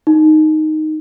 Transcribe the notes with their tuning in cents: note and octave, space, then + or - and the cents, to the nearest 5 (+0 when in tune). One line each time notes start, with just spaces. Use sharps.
D#4 -5